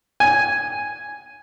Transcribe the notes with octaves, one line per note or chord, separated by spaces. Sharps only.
G#5